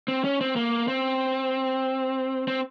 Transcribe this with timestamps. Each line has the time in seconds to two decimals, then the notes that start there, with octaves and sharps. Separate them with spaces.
0.08 C4
0.24 C#4
0.41 C4
0.56 A#3
0.88 C4
2.48 C4